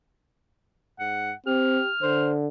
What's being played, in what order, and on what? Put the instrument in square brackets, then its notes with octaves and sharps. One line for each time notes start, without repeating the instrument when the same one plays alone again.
[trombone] G#2 [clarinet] F#5
[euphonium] C4 [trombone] G4 [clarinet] F6
[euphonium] D3 [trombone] C5